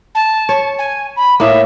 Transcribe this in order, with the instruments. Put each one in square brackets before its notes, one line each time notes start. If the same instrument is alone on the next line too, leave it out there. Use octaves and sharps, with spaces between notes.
[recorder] A5
[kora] C#5
[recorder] G#5
B5
[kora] A2 A#3 [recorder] E5